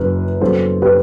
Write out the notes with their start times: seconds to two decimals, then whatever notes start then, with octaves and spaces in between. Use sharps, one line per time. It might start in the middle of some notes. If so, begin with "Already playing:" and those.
Already playing: F#1 F#2 F#3 B4
0.41 F#1 F#2 F#3 B3 A4 C5
0.82 G4 B4